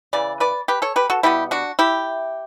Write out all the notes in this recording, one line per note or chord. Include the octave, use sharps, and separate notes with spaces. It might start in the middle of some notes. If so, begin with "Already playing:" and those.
C#3 E3 D5
B4 D5
G4 B4
A4 C#5
G4 B4
F#4 A4
B2 G3 B3 E4 G4
D4 F#4
E4 G4